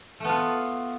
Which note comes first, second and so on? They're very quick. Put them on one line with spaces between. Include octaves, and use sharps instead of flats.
A3 B3 F4